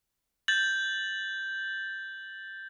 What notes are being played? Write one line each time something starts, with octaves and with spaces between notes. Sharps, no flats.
G6 A6 F#7